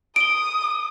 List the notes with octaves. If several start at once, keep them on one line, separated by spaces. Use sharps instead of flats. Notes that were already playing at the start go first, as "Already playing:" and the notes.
D#6 D7 G7